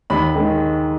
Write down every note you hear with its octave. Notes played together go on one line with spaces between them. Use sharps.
D#2 B5
D#3 G#3